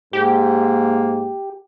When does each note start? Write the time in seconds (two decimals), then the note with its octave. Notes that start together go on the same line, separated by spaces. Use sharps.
0.13 G#2 A#3 G4